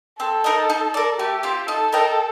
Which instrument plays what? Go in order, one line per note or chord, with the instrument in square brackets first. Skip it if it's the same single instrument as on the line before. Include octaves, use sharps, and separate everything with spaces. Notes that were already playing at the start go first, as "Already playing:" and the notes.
[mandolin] C4 [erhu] A4
[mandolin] D#4 A#4 D#5
D#4
A#4 D5
[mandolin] A3 [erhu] G4
[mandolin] C4 F4
[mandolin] D#4 [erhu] A4
[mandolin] A#4 D#5 G5